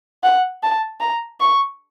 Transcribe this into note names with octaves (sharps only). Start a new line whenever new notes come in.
F#5
A5
A#5
C#6